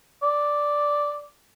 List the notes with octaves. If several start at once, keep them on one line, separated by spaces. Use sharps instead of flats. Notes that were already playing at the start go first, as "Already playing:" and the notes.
D5